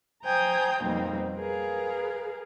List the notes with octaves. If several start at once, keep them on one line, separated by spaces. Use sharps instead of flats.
C5 G5 G#5 A#5 D#6 G6
F2 B2 G3 A#3 C4 D#4
G#4 A#4 B4 F5